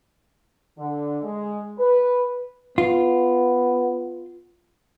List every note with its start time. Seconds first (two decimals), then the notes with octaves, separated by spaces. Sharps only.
0.79 D3
1.23 G#3
1.79 B4
2.78 B3 F4